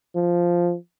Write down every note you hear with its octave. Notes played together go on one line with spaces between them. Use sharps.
F3